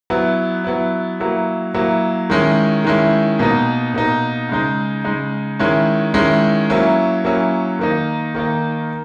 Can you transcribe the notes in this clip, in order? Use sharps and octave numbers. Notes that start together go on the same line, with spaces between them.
F#3 B3 E4
F#3 B3 E4
F#3 A#3 E4
F#3 A#3 E4
D#3 G#3 C#4 E4
D#3 G#3 C#4 E4
B2 A#3 D#4
B2 A#3 D#4
C#3 G#3 D#4
C#3 G#3 D#4
D#3 G#3 C#4 E4
D#3 G#3 C#4 E4
F#3 A#3 C#4 E4
F#3 A#3 C#4 E4
D#3 A#3 D#4
D#3 A#3 D#4